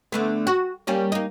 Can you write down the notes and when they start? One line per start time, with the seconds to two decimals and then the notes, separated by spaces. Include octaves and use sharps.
0.12 D3 A3 B3
0.47 F#4
0.87 G3 A#3 C#4
1.12 A#3 D#4